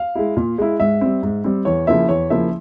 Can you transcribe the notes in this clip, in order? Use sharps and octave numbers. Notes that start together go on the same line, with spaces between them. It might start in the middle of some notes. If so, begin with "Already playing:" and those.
Already playing: F5
G#3 E4
A#2
G#3 E4
G#2 E5
G3 C4
G#2
G3 C4
E2 C#5
C#3 F3 A#3 E4 E5
E2 C#5
C#3 F3 A#3 E4 E5